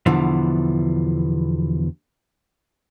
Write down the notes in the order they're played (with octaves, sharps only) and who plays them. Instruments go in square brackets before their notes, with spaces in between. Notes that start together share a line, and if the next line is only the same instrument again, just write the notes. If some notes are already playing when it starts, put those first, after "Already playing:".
[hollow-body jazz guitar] E2 B2 D3 E3 F3